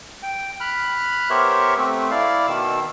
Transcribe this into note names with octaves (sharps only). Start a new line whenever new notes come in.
G5
B5 F6 F#6
B3 G4 A#4 C5 C#5 E5
A3 C4
E4 D5 F5
B2 D#3 E6